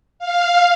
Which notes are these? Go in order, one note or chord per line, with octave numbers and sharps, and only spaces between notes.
F5